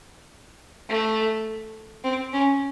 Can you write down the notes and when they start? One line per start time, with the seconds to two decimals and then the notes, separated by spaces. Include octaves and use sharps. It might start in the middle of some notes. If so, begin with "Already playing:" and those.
0.89 A3
2.04 C4
2.33 C#4